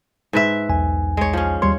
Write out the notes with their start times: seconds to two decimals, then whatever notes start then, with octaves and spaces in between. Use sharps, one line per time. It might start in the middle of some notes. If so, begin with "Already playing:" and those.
0.33 G#2 B4 E5
0.69 B1 E2 G#5
1.17 G#3 C#5
1.33 F3 C#4
1.62 D#2 G3 C#5 C6